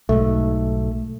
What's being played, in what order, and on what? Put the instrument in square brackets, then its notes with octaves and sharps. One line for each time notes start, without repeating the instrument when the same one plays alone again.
[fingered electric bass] B1 G#2 [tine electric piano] A3